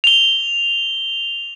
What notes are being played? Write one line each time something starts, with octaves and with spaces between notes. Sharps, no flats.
F7 G7